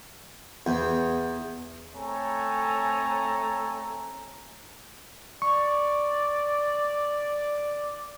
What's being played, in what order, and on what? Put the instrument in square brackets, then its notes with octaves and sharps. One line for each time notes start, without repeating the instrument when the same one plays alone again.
[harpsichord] E2
[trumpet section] A3 C4 A4 C#5 G#5 A#5
[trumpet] D5 [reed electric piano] C#6